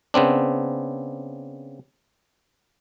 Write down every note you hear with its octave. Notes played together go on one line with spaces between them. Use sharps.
C#3 B3 C4 D4